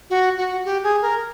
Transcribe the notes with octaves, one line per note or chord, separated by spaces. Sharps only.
F#4
F#4
G4
G#4
A#4